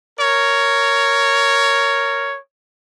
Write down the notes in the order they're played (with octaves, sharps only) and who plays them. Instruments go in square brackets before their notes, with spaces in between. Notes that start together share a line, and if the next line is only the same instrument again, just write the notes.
[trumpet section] A#4 C#5